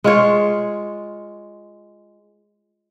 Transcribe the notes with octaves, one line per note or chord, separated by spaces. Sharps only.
G#3 F4 C#5